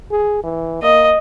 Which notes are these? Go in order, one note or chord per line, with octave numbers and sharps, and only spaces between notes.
G#4
E3
A#3 D#5